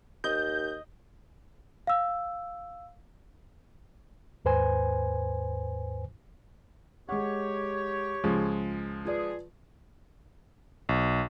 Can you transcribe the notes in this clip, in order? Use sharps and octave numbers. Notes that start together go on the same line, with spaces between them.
D#2 D#5 G6
F5 E6
D#2 G#2 B4 C5 G#5
G#3 G4 C#5 F#5
C#2 F3 G#3
F4 G#4 B4 D5
B1